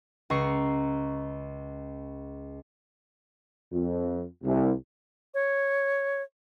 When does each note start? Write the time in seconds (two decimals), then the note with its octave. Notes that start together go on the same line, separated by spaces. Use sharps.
0.30 C#2 A#5 C#6 C7 C#7
3.72 F2
4.43 C2
5.34 C#5